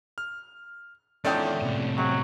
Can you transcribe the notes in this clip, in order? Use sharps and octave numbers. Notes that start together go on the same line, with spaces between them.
F6
E2 D#3 F3 G#3 C#4 A4 D5 G5
A2 C3
F#3 G#3 C4